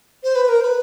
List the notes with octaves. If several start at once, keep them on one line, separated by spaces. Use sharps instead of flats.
C5
B4
A#4
C5
B4